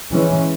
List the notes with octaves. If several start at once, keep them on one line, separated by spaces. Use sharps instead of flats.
E3 G#3 C#4